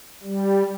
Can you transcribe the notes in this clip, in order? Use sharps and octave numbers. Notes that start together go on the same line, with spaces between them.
G3